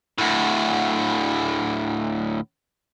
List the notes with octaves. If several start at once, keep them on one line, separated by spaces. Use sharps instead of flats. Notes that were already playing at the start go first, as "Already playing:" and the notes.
D2 A2